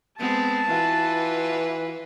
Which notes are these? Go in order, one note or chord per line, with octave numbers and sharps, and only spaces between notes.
G#3 B3 C4 A5
E3 F4 F#4 B4